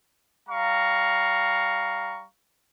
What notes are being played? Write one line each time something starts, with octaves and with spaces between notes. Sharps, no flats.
G3 F5 A#5 C#6